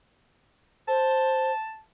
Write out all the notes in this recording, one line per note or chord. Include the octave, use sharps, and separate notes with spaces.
C5 A5